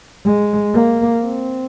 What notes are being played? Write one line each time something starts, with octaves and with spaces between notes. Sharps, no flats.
G#3
A#3
C4